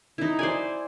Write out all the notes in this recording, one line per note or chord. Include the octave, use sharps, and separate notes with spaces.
D#4 E4
C5 D5 G#5